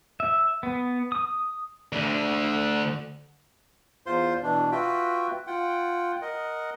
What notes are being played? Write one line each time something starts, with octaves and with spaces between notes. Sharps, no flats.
E5
B3
D#6
D2 D3
E2 F4 C5 C6
B2 E3 D4
F4 F#4 B4 E5 G5
F4 F#5 G5
A#4 D#5 F#5